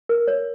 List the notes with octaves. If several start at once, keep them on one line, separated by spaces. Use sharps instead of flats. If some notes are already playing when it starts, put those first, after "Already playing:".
A#4
C#5